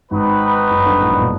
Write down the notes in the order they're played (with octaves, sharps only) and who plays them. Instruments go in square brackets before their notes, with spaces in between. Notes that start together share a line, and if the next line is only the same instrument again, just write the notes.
[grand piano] G#1 G#2 [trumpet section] C4 D#4 F#4 B4
[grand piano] F#1 F#2
G1 G2
A1 A2
A#1 A#2
B2